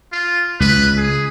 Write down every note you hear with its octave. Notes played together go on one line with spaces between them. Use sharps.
F4
C#2 B4
G#4